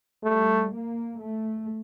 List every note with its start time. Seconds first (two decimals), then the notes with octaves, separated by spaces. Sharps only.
0.24 G3 A3
0.72 A#3
1.20 A3